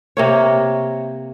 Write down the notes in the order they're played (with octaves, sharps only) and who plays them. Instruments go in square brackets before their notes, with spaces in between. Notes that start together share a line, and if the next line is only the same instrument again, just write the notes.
[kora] C3 A#3 C#5